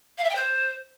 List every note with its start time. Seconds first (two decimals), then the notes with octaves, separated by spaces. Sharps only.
0.18 F5
0.24 E5
0.30 G5
0.35 C5